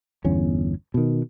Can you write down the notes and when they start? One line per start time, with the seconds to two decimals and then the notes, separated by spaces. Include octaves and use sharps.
0.24 G1 E2 C#4
0.94 B2 D#3